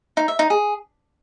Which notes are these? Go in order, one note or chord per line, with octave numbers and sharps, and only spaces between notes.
D#4
E5
D#4
G#4